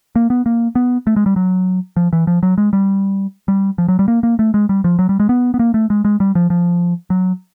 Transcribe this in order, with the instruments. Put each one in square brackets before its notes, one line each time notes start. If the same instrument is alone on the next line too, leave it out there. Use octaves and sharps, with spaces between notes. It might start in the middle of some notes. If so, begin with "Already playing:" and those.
[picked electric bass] A#3
B3
A#3
B3
A3
G#3
G3
F#3
F3
E3
F3
F#3
G#3
G3
G3
F3
F#3
G3
A#3
A#3
A3
G#3
G3
F3
F#3
G3
G#3
B3
B3
A#3
A3
G#3
G#3
G3
F3
F3
F#3